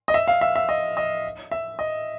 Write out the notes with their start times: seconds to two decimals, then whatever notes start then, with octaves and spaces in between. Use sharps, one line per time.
0.08 D#5
0.14 E5
0.27 F5
0.41 E5
0.56 E5
0.69 D#5
0.97 D#5
1.51 E5
1.79 D#5